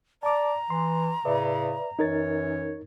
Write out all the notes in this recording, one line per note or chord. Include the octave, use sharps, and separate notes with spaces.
D5 A5 A#5 D6
E3 C6
A2 C#3 B4 D5 E5
F#2 E3 D#4 A#4 C#5 A6